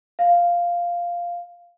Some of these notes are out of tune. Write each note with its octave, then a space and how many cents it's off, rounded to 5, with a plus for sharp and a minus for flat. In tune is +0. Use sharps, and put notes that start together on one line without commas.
F5 -5